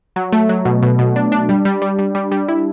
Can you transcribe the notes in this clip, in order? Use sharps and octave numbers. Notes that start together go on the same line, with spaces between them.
F#3
A3
F#3
B2
B2
B2
D4
D4
G3
G3
G3
G3
G3
G3
E4